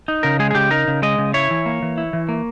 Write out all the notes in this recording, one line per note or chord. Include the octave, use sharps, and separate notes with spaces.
D#4
C#3 A#4
G#3 G#4
G#4
C#3 G4
D#4 A#4
C#3
G#3 D#5
C#3
E4 C#5
E3
A#3
E3
E4
E3
A#3